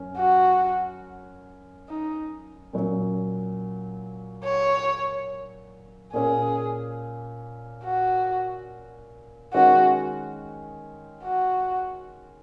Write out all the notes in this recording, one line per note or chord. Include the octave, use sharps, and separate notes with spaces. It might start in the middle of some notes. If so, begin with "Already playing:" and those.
Already playing: F#2 C#4
F#4
D#4
A#2 F#3 C#4
C#5
A#2 A#3 C#4 G#4
F#4
D#3 G#3 C#4 F#4
F#4